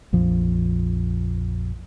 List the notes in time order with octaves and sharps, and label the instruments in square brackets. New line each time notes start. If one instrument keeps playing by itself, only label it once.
[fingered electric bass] A#1 F2 F3